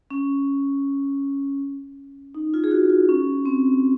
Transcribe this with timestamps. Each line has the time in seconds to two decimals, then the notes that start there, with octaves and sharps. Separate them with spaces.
0.11 C#4
2.35 D#4
2.54 F4
2.64 G#4
2.71 F#4
2.90 F4
3.09 C#4
3.46 C4